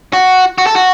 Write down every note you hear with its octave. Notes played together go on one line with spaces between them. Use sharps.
F#4
F#4
A4
F#4